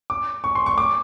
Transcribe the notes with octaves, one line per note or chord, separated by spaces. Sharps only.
D6
C#6
C6
C#6
D6